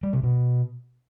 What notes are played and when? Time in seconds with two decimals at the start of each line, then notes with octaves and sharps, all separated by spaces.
0.03 G3
0.13 C3
0.23 B2